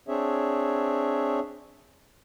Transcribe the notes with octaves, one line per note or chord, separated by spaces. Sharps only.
C4 D4 G#4 C#5 E5